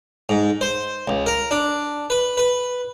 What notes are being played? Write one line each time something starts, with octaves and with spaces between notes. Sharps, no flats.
G#2
C5
C#2
A#4
D4
B4
B4